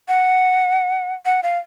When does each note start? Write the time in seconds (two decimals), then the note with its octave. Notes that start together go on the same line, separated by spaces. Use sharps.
0.08 F#5
1.25 F#5
1.43 F5